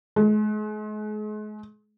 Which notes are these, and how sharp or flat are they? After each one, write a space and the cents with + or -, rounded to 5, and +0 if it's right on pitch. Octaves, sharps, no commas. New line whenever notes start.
G#3 +40